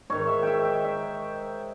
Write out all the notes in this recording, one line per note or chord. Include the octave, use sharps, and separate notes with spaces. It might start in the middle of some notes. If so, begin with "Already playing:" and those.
G#2 D#3 C#5
E5
E5 G5
G5
E5